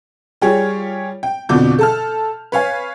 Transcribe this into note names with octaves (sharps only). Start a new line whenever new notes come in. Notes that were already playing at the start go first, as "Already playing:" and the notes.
G3 F4 G4 G#4 C#5
G5
F2 B2 D3 F3 D6 G6
A4 A5 F6
B4 C#5 F5 G#5